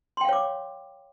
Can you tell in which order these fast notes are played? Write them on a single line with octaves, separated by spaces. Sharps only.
C6 G5 F5 C#5 D6